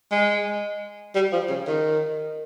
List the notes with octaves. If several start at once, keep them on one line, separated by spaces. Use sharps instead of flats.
G#3
G3
F3
C#3
D#3